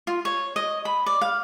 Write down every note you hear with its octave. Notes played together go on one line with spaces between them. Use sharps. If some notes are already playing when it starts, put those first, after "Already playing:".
F4
C#5
D#5
B5
D5
F5